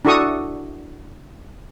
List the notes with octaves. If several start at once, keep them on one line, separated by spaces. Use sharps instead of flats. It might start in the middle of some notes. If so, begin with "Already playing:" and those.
D4 E4 F#4 A4 C#6 D#6